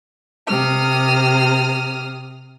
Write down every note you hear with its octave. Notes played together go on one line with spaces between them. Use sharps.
C3 D#6 F6